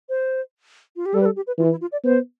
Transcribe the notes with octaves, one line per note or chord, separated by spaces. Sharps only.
C5
F4
G4
G3 A4
B4
A4
G4
B4
E3 F4
E4
F4
D5
B3 C5